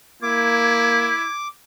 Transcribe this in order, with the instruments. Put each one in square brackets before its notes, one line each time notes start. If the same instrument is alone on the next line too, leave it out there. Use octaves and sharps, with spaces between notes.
[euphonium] A#3 [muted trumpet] E4 [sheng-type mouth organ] D6 [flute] G#6